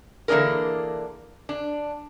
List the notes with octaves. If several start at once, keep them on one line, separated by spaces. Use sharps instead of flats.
D3 E3 A#3 D4 G#4 A#4
D4